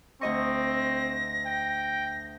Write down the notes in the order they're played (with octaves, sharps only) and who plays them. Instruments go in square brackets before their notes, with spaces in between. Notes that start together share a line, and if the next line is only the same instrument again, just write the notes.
[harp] D2 D#5 C#6 [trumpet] C4 [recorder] A#6
[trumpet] G5